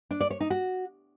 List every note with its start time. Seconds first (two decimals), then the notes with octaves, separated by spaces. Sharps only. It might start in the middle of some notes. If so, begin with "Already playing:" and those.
0.11 D4
0.21 D5
0.30 C#5
0.40 D#4
0.50 F#4